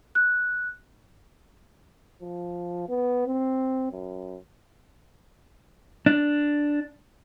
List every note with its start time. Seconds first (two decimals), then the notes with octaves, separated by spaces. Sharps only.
0.15 F#6
2.22 F3
2.89 B3
3.26 C4
3.92 F#2
6.06 D4